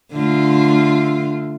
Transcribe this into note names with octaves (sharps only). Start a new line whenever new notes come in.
D3 A3 F4